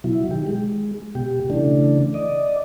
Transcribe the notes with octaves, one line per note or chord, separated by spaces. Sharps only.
B2 F#3 E4
D#3 G4
G#3
B2 G4
C#3 E3 A3 D4
D5 D#5